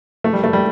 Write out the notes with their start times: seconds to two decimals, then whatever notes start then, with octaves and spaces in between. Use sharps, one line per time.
0.24 A3
0.33 G3
0.44 A3
0.53 G3